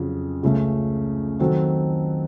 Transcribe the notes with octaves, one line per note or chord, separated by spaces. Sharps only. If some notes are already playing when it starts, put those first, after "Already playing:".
Already playing: F2 C#3 F#3
C#2 C#3 A3
D#3 F#3 C4 F#4 A4